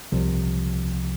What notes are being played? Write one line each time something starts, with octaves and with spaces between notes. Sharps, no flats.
C2 C3 F3